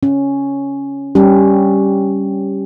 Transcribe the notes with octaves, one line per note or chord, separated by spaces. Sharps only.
C#4
G3 C#4 G4